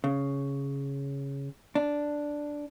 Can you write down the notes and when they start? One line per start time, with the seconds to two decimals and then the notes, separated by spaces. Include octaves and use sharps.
0.04 C#3
1.75 D4